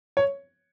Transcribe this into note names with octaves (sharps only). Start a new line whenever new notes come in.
C#5